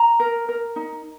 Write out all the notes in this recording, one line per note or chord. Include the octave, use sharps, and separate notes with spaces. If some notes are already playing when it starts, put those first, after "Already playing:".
Already playing: A#5
A#4
A#4
D#4